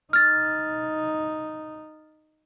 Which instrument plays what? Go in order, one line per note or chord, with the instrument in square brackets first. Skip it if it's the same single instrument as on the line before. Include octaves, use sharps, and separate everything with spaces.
[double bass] D#4 [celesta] F6 A6